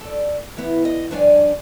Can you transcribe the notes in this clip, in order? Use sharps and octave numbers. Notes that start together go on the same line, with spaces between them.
A4 D5
E3 B3
D#5
G2 F3 D4 C#5 D5 G#5